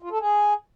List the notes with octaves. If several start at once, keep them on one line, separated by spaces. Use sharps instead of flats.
F4
A4
G#4